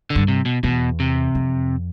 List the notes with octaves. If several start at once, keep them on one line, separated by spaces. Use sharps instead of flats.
D3
G2
C3
B2
E2 B2
C3
F2